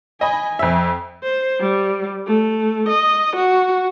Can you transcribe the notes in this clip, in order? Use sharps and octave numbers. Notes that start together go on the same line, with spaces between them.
D#5 G#5 B5
F2 E5
C5
G3
A3
D#5
F#4